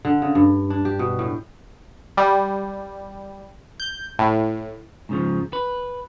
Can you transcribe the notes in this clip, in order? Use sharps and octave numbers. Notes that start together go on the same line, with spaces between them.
D3
C#3
G2
D4
G4
B2
A2
G3
G6
A2
G#2 C#3 F3
B4